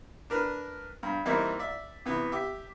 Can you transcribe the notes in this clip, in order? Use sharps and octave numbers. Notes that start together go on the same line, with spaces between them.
D4 A#4 B4
G2
E3 G3 A#3 C4 D#4 E4
D5 E5
C3 E3 B3
G4 E5